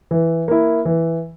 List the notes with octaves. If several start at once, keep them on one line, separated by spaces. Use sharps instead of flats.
E3
A#3 E4
E3